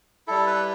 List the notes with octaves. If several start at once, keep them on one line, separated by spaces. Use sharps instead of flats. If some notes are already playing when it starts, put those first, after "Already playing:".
G3 E4 A4
B4